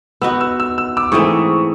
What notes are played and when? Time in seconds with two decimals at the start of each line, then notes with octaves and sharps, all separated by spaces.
0.22 B3 D#4 F#4 E6
0.41 E6
0.60 E6
0.78 E6
0.97 D6 E6
1.12 G#2 E3 A3 C4 C#6 D#6